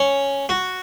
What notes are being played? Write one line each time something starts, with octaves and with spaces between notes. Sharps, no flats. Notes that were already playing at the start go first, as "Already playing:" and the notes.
Already playing: C#4
F#4